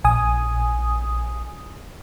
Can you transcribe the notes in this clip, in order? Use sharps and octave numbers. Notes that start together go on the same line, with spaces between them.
A#1 G#5 D#6